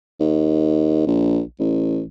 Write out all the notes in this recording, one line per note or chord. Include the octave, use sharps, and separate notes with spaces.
D#2
A#1
A1